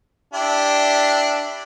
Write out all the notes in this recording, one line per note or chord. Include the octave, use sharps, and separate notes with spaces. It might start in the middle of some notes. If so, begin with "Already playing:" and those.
D4 E4 G4